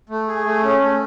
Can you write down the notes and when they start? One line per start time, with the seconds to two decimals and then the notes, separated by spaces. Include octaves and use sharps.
0.09 A3
0.28 G#4
0.46 A3
0.64 C#4
0.82 A3